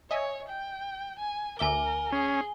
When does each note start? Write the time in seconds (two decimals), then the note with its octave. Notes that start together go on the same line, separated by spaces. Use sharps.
0.11 C#5 D#5 E5 G#5
0.48 G5
1.19 G#5
1.59 D2 A#4 E5 G#5 D6 G7
2.12 C#4 G#4